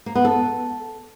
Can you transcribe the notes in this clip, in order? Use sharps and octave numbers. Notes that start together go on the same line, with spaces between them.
A#3
B3
A4